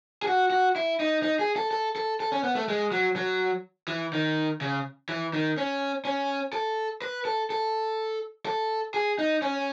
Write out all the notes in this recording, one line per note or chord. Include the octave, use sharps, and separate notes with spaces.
G#4
F#4
F#4
E4
D#4
D#4
G#4
A4
A4
A4
A4
C#4
B3
A3
G#3
F#3
F#3
E3
D#3
C#3
E3
D#3
C#4
C#4
A4
B4
A4
A4
A4
G#4
D#4
C#4